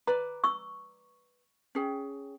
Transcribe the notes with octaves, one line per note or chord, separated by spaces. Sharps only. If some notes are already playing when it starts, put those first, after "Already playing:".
B4 D5 A#5
C#6 E6
C#4 G#4 G5